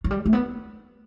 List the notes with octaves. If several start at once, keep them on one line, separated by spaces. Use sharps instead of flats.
F#3
G3
A3
B3